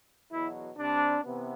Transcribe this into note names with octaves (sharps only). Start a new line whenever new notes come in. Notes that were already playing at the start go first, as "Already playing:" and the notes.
E2 B2 F#3 E4
C3 G3 C4 D4
C3 E3 B3